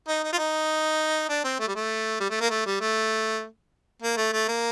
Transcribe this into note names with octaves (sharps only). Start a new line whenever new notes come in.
D#4
D#4
F4
D#4
D4
C4
A3
G3
A3
G3
A3
A#3
A3
G3
A3
A#3
A3
A3
A#3